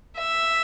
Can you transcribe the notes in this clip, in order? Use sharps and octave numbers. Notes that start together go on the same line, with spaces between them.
E5